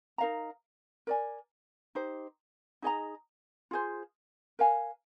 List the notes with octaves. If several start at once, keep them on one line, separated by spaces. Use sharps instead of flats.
D#4 A#4 F5 A#5
A#4 D5 G#5
D#4 G4 C5
D#4 G#4 D#5 A#5
F4 G#4 C5
A#4 F5 G#5